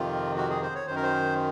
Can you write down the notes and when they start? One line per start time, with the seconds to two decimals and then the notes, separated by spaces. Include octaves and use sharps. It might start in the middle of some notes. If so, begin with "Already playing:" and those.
Already playing: F2 C3 D#3 F4
0.36 F#4
0.50 G#4
0.62 C5
0.75 C#5
0.87 F#2 D#3 C5
0.96 A#4
1.03 C5